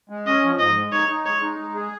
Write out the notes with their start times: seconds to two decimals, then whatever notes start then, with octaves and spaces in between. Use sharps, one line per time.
0.09 G#3
0.27 C#4 D#5
0.43 F3
0.59 G#2 D#5
0.76 G#3
0.92 D#4 C#5
1.09 D#4
1.26 G#3 C#5
1.42 D#4
1.59 G#3
1.75 G#4